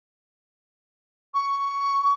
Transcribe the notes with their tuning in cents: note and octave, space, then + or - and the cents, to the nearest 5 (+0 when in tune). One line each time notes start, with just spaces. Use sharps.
C#6 +10